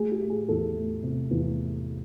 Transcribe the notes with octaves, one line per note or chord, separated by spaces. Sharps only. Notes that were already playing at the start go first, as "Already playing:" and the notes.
Already playing: A3 G#4
G4
A3
G#4
E2 A4
A3
C3
E2